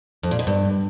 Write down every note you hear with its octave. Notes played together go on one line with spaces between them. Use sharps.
F2
A#2
B2
G2